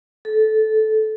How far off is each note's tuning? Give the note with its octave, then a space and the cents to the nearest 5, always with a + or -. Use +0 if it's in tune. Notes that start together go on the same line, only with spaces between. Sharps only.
A4 -15